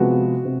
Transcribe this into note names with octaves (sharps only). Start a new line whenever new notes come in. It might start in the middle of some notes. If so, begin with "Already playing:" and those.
Already playing: C3 F3 G#3 B3 F#4
C3